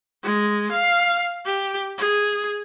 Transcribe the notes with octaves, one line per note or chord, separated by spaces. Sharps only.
G#3
F5
G4
G#4